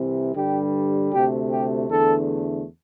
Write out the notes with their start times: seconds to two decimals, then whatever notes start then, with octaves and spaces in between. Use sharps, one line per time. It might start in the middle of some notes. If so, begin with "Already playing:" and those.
Already playing: C2 C3 E3
0.35 G2 D3 G3 G4
1.12 D2 C3 A3 G4
1.51 G4
1.89 E2 D3 A3 A4